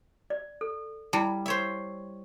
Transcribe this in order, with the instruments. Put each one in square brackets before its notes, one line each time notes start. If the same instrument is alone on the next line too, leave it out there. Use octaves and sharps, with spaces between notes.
[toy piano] D5
A4
[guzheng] G3 [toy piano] E4 D5 A5
[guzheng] C5 C#5 E5